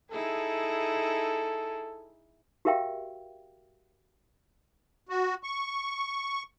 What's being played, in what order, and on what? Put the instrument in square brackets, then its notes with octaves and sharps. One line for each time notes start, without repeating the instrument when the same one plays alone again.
[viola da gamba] D#4 E4 G#4 [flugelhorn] A4
[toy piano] F#4 G4 A#4 E5 F5 G5
[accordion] F#4
C#6